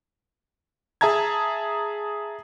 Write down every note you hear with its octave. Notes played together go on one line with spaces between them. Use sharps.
G#4 E5 A5 A#5 G#6